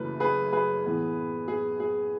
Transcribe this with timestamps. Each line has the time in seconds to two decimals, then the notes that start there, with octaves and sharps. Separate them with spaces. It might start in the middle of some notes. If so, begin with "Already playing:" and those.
Already playing: F#1 F#2 E3 A3 B4
0.20 G#4 B4
0.52 G#4 B4
0.84 A2 E3 B3
1.48 G#4
1.80 G#4